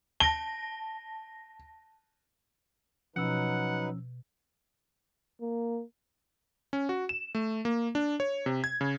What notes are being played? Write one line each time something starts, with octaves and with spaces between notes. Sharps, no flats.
A5 A#6 G7
B2 F3 F#3 C#4 D#4 B4 F#5 E6
A#3
C#4
F#4
E7
A3
A#3
D4
C#5
C3
G#6
C#3